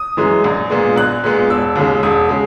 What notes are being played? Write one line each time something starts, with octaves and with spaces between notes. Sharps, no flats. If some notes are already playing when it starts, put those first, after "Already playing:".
Already playing: D#6
F#2 E3 G#3
A#1
A#2 G#3 B3
A#1 F#6
A#2 G#3 B3
E1 E6
D#2 C#3 G#3
E1 D#6
C#3 G#3